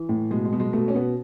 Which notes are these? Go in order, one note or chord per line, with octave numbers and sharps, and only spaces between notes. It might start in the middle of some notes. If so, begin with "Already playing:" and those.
Already playing: E3
A2
B2 G#3
G#3
B2
G#3
B2 A3
C#4
B2 B3